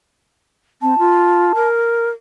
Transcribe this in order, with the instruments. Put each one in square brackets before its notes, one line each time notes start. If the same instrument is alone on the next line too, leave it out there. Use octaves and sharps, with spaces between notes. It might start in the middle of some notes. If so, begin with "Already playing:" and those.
[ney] C4 [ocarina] A5
[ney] F4
A#4